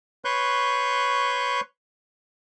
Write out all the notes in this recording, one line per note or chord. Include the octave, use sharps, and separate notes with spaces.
B4 C#5 C6 C#6 F#6 G6